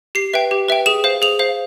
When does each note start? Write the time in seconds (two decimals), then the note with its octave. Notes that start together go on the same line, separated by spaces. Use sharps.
0.15 G4 C7
0.33 B4 E5 G5
0.51 G4
0.69 B4 E5 G5
0.86 G#4 E7
1.04 C5 F5
1.22 G#4 F7
1.39 C5 F5